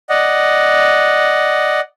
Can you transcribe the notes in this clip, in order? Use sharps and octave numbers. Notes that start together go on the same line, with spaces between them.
D5 D#5 F#5